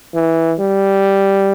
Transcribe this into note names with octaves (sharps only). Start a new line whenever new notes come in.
E3
G3